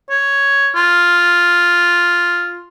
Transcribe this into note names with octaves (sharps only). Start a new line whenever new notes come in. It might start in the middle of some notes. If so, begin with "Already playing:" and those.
C#5
F4